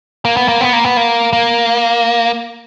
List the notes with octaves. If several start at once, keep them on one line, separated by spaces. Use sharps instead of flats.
A#3
B3
A#3
B3
A#3
B3
A#3
A#3